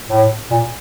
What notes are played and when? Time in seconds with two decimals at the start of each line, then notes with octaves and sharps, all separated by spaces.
0.09 A2
0.51 A#2